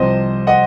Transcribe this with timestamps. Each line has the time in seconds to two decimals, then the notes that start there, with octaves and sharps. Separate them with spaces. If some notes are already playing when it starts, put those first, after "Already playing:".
Already playing: C2 C3 F3 C5 D#5
0.47 D#5 F#5